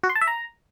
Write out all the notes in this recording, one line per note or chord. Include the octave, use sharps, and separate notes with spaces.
F#4
C6
A5
E5
A#5